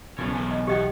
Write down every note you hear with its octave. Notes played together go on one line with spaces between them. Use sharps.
B1 A2 C#3 C#4
E2 D#3 G#5
D#5
E3 B3 G4 D#5 G5